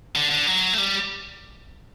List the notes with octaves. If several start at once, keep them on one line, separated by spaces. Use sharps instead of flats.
D3
D3
F#3
A3
G3